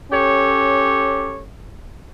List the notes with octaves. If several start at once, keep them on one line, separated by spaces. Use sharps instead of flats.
C#4 G4 A4 C#5